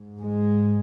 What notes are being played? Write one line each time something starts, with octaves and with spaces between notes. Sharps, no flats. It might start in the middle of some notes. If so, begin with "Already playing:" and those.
Already playing: G#2
G#3